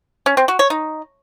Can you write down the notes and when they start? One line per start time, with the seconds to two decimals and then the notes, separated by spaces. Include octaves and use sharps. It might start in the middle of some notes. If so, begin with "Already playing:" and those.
0.26 C#4
0.37 C4
0.48 F#4
0.59 C#5
0.70 D#4